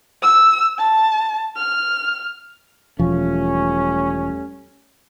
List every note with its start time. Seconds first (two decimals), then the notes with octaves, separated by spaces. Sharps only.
0.22 E6
0.79 A5
1.56 F6
2.99 E1 F3 G3 A3 C#4